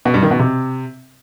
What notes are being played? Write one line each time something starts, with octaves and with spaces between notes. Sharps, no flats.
B2
G2
D#3
B2
C3